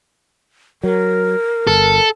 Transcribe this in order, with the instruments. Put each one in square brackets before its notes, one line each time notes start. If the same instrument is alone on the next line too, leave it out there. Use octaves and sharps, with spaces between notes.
[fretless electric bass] F#3 [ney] A#4
[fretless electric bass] G1 [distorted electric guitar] A4